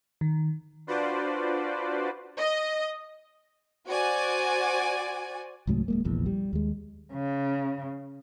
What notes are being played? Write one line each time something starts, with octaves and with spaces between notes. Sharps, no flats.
D#3
D4 F4 F#4 B4 C5 D5
D#5
F#4 C5 D5 G#5
C2 G#2 F#3 A3
D1 G#3 A#3
F1 A#1 E2
G3
D#2 G#3
C#3